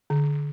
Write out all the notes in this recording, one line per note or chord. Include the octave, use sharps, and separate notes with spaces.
D3